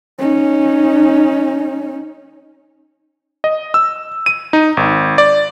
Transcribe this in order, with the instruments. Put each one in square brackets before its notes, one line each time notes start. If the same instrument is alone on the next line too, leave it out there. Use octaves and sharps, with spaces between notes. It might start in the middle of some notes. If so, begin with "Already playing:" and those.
[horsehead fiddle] C#4 D#4
[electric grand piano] D#5
E6
D#7
D#4
G#1
D5